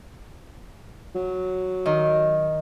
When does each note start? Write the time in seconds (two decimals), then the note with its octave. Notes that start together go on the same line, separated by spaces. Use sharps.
1.15 F#3
1.86 D#3